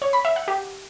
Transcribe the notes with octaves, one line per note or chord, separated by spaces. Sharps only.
C#5
B5
E5
F#5
G4